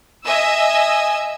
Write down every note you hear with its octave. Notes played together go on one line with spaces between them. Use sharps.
D#5 E5 G#5 E6